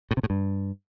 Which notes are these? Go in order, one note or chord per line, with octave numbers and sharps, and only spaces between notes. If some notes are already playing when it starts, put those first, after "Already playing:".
A2
C3
A2
G2